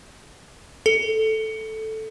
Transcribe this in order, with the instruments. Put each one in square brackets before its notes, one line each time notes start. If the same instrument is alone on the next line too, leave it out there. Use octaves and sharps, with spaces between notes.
[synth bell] A4